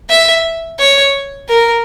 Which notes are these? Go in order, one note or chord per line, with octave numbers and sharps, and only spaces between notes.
E5
C#5
A#4